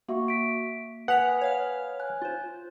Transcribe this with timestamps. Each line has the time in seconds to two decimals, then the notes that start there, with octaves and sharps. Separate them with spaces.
0.09 A#3 F#4 E5 C#6
0.28 B6 D7
1.08 B4 F#5 G#5 D#6 B6 F7
1.41 C#5 F5 F6
2.00 G#5 F#6
2.22 F4 C5